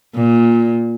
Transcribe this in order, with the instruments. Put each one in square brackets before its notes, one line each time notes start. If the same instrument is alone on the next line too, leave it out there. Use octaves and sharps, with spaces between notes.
[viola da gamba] A#2